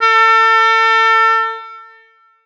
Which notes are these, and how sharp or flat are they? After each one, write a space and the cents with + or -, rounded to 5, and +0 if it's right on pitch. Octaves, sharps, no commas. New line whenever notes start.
A4 +35